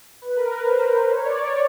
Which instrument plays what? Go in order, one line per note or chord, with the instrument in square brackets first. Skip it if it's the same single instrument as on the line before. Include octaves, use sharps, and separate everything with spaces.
[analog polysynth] B4
A#4
B4
C5
C#5
D5
C#5